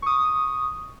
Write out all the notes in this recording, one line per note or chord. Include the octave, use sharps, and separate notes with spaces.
C#6 D#6